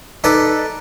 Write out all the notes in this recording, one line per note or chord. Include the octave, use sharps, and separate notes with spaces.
D#4 A4 B4 D5